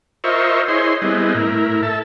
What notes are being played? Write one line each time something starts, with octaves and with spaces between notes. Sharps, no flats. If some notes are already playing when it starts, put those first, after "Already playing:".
F4 A#4 C5 D#5 E5 C#6
E4 G#4 C5 C#5 D#5 C6
G3 B3 C4 E4 G#4 D#5
A2 E4 A#4
A4 E5 A5